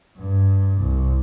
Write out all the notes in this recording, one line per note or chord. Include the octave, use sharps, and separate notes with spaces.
G2
C2